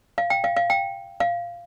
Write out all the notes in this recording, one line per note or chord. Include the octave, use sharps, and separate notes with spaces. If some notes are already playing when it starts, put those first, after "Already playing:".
F5
G5
F5
F5
G5
F5